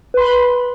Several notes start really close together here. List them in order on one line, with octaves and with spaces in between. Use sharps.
B4 C6 B5